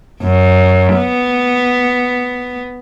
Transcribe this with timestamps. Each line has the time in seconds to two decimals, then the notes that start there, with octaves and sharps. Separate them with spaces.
0.21 F#2
0.96 B3